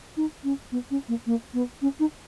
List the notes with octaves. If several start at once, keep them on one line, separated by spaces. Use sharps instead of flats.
D#4
C#4
B3
C#4
A#3
A#3
B3
C#4
D#4